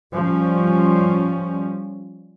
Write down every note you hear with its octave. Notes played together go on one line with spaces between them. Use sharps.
F3 G3 C#4